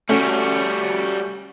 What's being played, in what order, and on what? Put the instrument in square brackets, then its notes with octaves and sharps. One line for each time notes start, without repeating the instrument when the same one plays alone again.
[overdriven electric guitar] G3 F#4 [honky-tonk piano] A3 C#4